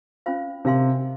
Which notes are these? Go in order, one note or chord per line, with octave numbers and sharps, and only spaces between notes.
C#4 F4 C5 F5
C3 A#4 F5 G#5 C6